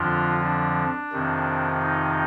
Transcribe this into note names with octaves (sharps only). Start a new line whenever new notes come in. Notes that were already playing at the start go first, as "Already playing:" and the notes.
Already playing: F2 D3 F3 D4 F4
D4
F2 C3 D#3
D#4